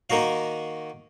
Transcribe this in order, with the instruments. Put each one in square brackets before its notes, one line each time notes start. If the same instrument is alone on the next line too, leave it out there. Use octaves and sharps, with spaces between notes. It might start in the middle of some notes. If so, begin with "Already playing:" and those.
[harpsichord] D#3 A#3 D#4 F#4 F5